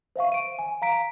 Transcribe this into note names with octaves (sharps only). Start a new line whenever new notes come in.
C5 E5 F5 C#6
D7 D#7
G#5
F5 A#5 B6 D7